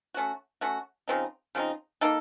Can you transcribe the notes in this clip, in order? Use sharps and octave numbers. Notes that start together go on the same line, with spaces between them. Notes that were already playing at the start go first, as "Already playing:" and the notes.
A3 C#4 F#4
A3 C#4 F#4
C#3 F3 C4 D#4
C#3 F3 C4 D#4
A#3 D#4 A4